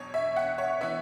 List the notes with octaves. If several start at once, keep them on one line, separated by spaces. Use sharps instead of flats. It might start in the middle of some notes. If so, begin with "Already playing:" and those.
Already playing: E2 B2 F#3 C#5
E5
F#5
C#5
E3 B3 E5